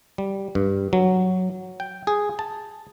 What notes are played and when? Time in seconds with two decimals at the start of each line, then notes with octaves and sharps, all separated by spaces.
0.18 G3
0.55 G2
0.93 F#3
1.80 G5
2.07 G#4
2.39 A5